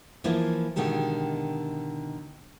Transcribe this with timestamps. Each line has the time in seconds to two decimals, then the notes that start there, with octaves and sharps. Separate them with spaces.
0.24 E3 F3 A#3 E4 F4
0.76 B2 D3 D#3 G#3 G4